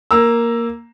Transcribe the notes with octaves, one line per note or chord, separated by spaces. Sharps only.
A#3 A#5 E6